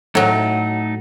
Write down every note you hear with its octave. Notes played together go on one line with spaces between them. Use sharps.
A2 F#3 A3 D#4